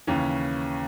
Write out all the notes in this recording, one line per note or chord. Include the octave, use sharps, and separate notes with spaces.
D#2 C#3 E3 C#4